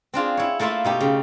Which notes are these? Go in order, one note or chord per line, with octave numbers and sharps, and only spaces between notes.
C4 D4 F4 G#4
E4 C#5
A3 A#3 E4 F4 E5
B2 D#4 G4
C#3